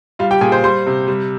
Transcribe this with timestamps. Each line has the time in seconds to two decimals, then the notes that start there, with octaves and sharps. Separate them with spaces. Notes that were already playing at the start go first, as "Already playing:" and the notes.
0.19 G3 F4 F5
0.31 G4 G5
0.41 A#2 G#4 G#5
0.52 C5 C6
0.64 G3 C5 C6
0.87 C3
1.08 G3